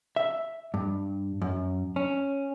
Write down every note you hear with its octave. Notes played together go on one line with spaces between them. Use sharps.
E5
G2
F#2
C#4